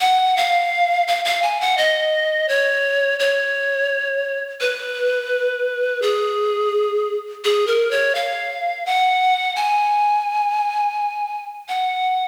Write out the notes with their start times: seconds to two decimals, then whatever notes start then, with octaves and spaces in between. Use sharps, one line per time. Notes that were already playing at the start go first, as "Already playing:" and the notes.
0.01 F#5
0.37 F5
1.08 F5
1.25 F5
1.42 G#5
1.61 F#5
1.78 D#5
2.49 C#5
3.20 C#5
4.61 B4
6.02 G#4
7.45 G#4
7.67 A#4
7.91 C#5
8.15 F5
8.86 F#5
9.56 G#5
11.69 F#5